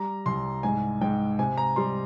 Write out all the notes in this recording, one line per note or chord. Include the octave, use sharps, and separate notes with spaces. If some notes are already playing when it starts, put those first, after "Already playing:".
Already playing: G3 A#5
C2 C6
G#2 G#5
G#2 G5
C3 G#5
A#5
G3 C6